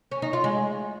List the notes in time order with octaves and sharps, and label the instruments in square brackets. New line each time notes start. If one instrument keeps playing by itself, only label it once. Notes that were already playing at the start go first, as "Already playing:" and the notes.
[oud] C#4
D#4
F4
G#3